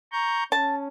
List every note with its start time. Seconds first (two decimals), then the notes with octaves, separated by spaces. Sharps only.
0.12 A#5 C#6 G6
0.52 C#4 A5